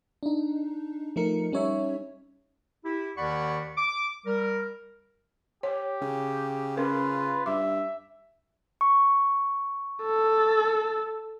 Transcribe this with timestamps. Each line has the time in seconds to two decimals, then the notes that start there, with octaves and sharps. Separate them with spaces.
0.23 D4 D#4
1.16 F3 A3 D#4 A#4 C#7
1.52 G3 C#4 D#4 C#5 E5
2.84 E4 G4
3.16 D#2 D#3 D5 F#5 B5 C#6
3.77 D6
4.26 G3 A#4
5.63 G4 C#5
6.02 C#3
6.77 C#4 F4 A#4 B4
7.46 G2 E5 D6
8.81 C#6
10.02 A4